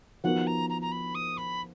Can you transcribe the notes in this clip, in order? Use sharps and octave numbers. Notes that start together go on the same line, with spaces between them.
F3 B3 D#4 F#4 A#4 F#5
A#5
A#5
A#5
B5
D#6
B5